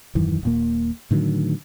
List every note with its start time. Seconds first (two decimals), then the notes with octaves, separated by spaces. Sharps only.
0.15 D#1 F#2 D#3 E3
0.43 D#1 A#2 A#3
1.11 A2 D3 D#3 F#3